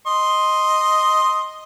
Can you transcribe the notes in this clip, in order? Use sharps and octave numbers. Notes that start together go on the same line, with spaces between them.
D#5 C6